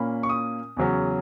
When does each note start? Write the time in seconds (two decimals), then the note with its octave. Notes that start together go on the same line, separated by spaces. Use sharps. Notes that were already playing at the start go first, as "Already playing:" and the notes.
Already playing: A#2 A#3 C#4 B5
0.23 C#6
0.29 D#6
0.77 E2 C#3 F#3 C#4